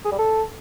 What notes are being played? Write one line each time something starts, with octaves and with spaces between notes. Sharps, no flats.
G#4
G3
A4